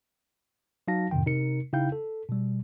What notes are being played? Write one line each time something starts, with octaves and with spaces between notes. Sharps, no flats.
F#3 D#4 F#4 F5 A5 A#6
F2 A2 C3 D#3 G5
C3 D#4 A#4 C#7
C#3 D#4 E4 F5 G5 G6
A4
B2 G3